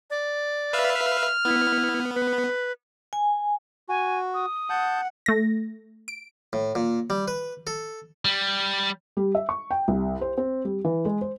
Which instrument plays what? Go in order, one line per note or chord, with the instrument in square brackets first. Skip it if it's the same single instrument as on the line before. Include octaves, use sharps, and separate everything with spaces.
[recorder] D5
[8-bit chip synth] B4 E5 F5 [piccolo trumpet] F6
[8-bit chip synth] B3 [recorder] E4
[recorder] B4
[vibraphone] G#5
[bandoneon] F#4 [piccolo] G#5
[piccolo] D#6
[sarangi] F#5 [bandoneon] A5 G6
[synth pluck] A3 A#6
D7
[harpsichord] A2
A#2
G3
B4
A4
[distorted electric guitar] G3
[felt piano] G3
E5
C#6
G5
C2
C5
C4
G3
E3
G#3
C5